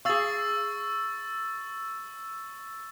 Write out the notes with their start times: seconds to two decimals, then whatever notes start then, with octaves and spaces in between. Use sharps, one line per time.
0.05 G#4 F5 C#6 E6 A6